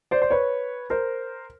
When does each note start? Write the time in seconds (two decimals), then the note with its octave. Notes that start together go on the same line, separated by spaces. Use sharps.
0.11 C5 D5
0.22 C5
0.31 B4 C#5
0.90 A#4 C5